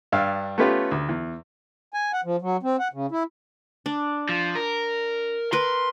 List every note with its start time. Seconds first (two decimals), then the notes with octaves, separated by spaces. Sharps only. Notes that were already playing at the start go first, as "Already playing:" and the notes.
0.12 G2 D4 F5 E6
0.58 A3 B3 C#4 F4 G4 B4
0.91 D2
1.09 E2
1.94 G#5
2.13 F#5
2.25 F3
2.42 F#3
2.63 C4
2.79 F#5
2.93 C#3
3.11 E4
3.86 D4
4.29 F3
4.55 A#4
5.53 A#4 B4 C6